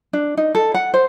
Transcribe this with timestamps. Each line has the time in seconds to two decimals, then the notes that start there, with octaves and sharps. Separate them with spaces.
0.13 D4
0.37 D#4
0.55 A4
0.74 F#5
0.94 C5